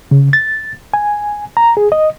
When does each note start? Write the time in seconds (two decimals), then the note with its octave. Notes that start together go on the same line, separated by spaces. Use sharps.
0.11 C#3
0.33 A6
0.94 G#5
1.57 A#5
1.77 G#4
1.92 D#5